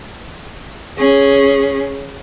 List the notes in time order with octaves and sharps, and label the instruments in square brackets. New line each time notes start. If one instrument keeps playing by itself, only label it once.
[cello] C#4 G#4